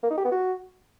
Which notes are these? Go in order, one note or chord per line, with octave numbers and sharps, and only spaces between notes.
A#3
D#4
G4
B3
F#4